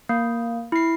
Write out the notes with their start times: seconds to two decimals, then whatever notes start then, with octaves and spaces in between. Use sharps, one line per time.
0.09 A#3
0.72 E4 C7